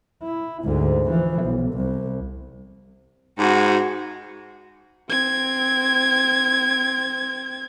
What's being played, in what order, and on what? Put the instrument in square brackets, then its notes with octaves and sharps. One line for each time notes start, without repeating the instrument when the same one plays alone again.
[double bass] E4
D2 G#2
E3 F3
B1
C2
[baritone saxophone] G#2 [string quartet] F#4
[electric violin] C4 G#6